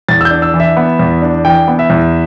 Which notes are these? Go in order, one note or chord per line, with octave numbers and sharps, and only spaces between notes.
E2 A6
E6
G6
D4
E6
E3
E5
B3
E2
D4
E3 G5
B3
E5
E2